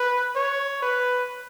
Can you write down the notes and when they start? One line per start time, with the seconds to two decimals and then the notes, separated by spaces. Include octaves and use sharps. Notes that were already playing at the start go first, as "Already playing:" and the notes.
Already playing: B4
0.35 C#5
0.82 B4